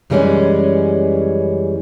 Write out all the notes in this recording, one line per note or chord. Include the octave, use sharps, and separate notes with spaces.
F#2 E3 G3 G#3 B3 C#4